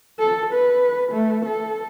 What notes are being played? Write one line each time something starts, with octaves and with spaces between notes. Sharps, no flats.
A4
B4
A3
A4